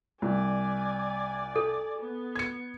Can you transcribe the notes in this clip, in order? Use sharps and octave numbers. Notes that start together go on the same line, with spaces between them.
C2 D5 G#5
A4
B3
G#6 C#7